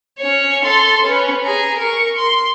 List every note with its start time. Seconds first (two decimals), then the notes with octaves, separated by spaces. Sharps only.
0.19 C#4 C#5
0.65 A4 C6
1.04 C#4 B4
1.44 G#4 A#5
1.78 A#4 C#6
2.17 C6